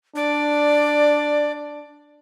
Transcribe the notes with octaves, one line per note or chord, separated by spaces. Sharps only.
D4 D5